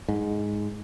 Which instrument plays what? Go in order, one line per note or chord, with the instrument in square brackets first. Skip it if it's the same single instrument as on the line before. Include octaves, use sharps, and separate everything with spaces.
[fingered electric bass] G#2